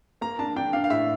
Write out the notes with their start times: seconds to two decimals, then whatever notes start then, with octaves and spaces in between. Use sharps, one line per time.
0.21 A#3 A#5
0.39 D4 A5
0.56 D4 G5
0.73 D4 F5
0.84 F5
0.90 A2 E5